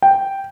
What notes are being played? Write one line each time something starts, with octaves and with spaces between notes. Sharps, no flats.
G5